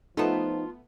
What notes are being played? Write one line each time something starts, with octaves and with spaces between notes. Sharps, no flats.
F3 A3 B3 D#4 F4 A5